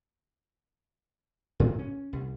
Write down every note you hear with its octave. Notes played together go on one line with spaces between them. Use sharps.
A2
C#4
C2